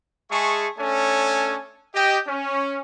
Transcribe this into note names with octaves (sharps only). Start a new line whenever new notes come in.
G#3 G#4 E5 A5 C#6
A3 C#4 D4 A4 C#5 G#5
G4 D#5 G5
C#4